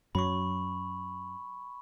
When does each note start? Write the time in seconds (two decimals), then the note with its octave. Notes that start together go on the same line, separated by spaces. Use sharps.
0.15 F#2 F#3 B5 C#6